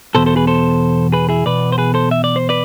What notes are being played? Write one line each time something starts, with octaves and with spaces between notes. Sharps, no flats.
E2 B2 A4 C5
A4 C5
G#4 B4
A4 C5
G#4 B4
E4 G#4
E2 B2 B4 D5
C5
G#4 B4
A4 C5
E5
D5
C5
B4 D5